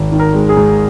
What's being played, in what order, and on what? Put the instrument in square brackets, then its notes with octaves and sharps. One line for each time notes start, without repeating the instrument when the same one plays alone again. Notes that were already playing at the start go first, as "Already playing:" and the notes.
Already playing: [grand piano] G#1
D#3
A#4
G#3
G#4
G#2